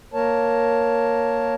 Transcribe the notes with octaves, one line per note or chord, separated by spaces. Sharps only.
A#3 A#4 C#5 A5